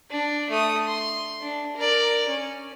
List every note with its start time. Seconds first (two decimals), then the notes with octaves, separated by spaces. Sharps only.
0.10 D4
0.50 A3 D#6
0.87 C6
1.41 D4
1.77 A#4 D5
2.29 C#4